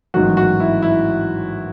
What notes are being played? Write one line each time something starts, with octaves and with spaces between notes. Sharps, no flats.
A1 G#2 D#3 F#3 F#4
F#4
E4
E4